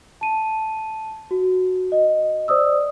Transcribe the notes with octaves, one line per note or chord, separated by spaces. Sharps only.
A5 D#7
F#4
D#5
C5 D5 D#6 E6